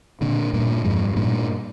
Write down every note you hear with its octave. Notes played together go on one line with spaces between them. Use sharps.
A#2 D3
G2 A#2
F2 G#2
G2
G2 A#2